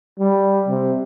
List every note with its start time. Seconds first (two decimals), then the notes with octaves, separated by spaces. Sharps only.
0.19 G3
0.68 C3